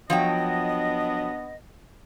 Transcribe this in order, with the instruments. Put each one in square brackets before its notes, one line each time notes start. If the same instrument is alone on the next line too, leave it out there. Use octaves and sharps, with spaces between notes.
[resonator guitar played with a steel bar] F3 F#3 G5 [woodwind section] B3 D4 D#5